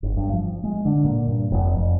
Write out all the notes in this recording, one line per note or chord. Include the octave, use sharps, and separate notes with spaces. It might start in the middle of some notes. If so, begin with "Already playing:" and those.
G1
G2
F3
G#3
D3
A#2
G2
F1
F2